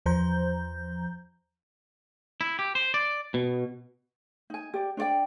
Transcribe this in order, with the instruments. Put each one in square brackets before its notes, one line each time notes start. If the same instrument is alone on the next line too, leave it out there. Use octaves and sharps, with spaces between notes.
[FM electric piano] E2 F3 C5 A#5 G6
[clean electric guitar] E4
G4
C5
D5
B2
[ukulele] D#4 G#5
G4 D5
D4 C#5 D5 G5